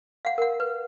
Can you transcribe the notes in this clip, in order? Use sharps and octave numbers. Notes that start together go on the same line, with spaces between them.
F5 F#5
A#4 F#5
B4